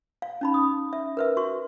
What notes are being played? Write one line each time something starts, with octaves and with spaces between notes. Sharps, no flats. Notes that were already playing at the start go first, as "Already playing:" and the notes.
F5
C#4 D#4 B5
D#6
E5
A#4 B4 E5
F#4 C#6